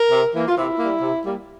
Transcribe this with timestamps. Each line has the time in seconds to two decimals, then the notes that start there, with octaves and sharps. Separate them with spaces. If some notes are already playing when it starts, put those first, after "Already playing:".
Already playing: A#4
0.12 C3
0.34 E3 A#3
0.48 F4
0.57 C3 E4
0.79 G3 A#3
1.02 C3
1.25 G3 A#3